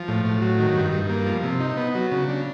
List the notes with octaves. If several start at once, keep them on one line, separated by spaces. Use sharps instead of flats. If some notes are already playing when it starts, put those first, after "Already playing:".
Already playing: F3
A2
A2
F#3
D#3
G2
G2
A#3
F3
C3
D#4
B3
F#3
C#3
D4